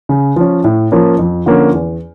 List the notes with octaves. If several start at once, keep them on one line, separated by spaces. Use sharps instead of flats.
C#3
F3 C#4
A2
F3 A#3 C#4
F2
D3 F3 A#3 C#4
E2